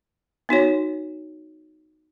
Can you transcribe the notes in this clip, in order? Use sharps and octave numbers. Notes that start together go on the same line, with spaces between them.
B3 D#4 F#4 C#5